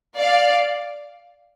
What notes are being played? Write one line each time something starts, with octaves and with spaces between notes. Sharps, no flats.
D5 F5